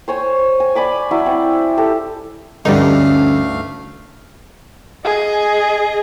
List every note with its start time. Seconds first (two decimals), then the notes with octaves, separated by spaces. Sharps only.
0.08 C5 C#5 G#5
0.60 G#5
0.75 D5 G#5 B5 D6
1.11 F#3 E4 D5
1.26 C4
1.77 G4 A4
2.65 D2 G2 D3 G3 A3 C#4 D#4 F5
5.04 G#4 D#5